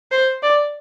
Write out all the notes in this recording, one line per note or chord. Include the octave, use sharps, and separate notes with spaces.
C5
D5